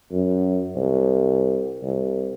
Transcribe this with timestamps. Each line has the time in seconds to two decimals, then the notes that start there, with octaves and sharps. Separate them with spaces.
0.12 F#2
0.76 C2
1.82 C2